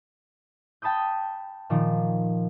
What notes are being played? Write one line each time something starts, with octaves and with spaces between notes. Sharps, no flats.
G5 A5 B5 D#6 G6
A#2 D#3 F3